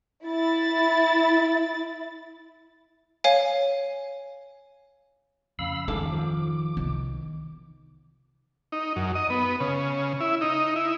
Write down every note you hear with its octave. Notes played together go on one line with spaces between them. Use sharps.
E4 A6
C#5 F5 G#5
F2 C#3 F5 B5 E6
G#2 D#3 A4 F5 D6
F3
C2 C3 D#3 B3
D#4
F#2
D#5
B3
C#3
E4
D#4
E4